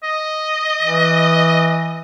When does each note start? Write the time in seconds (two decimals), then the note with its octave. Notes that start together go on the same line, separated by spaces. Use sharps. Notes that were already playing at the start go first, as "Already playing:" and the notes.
0.03 D#5
0.82 E3